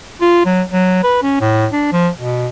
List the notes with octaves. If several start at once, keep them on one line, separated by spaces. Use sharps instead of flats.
F4
F#3
F#3
B4
C#4
A2
D4
F3
B2